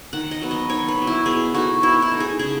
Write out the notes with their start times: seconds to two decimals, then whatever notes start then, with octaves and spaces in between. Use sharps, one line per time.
0.13 D#3 F#5
0.31 D#5
0.41 F#3 B3
0.51 D#5
0.69 D#3 C#5
0.88 B4
0.98 F#3 B3
1.07 E4
1.26 B2 G#4
1.54 A3 D#4 F#4
1.83 B2 E4
2.02 E4
2.11 A3 D#4
2.20 G#4
2.39 C#3 G#4